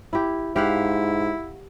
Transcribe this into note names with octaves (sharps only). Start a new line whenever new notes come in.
E4 G4
G#2 E4 G4 F5 F#5